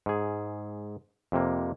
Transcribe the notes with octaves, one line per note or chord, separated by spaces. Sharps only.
G#2 G#4
F2 C3 A#3